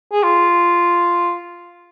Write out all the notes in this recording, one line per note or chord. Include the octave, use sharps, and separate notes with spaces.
G#4
F4